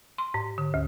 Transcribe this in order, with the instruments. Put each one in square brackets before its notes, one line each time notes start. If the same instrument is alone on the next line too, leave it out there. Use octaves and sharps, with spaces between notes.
[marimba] C6
G#2
D3
D2